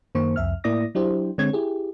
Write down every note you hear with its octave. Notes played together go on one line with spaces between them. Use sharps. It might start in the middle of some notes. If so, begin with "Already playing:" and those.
F#2 D#3 A#3 C5 C#6
C2 F2 E5 F6
A2 A#3 E4 D5 D#6 A#6
F#3 D4 E4 G4 C5
D3 G#3 C4 C#5 G#6
E4 G4 G#4